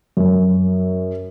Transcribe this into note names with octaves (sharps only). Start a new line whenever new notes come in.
F#2